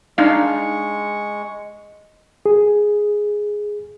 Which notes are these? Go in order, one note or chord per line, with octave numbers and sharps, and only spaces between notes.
G#3 D4 D#4 F5 C#6
G#4